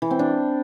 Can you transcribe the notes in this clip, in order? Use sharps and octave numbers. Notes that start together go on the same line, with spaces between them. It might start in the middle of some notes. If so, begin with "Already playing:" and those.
E3
C4
D4